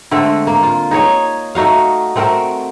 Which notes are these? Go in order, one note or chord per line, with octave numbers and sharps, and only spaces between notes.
D3 G#3 A3 C4
A#3
F4
D#4 G#4 C#5 D#5
A3 D#4 F#4 F5
A3 C4 F#4 A#4